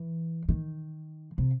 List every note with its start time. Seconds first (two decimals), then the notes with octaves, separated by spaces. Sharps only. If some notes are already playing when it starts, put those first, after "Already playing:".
Already playing: E3
0.49 D#3
1.38 C3